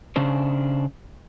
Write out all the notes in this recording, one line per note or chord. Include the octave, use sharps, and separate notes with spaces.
C#3 C#4 D4 C5